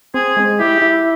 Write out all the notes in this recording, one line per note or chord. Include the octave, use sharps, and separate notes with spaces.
C4 G#4
G#3
E4 G4
E4